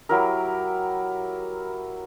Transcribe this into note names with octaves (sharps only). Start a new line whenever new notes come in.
F#3 E4 G4 A#4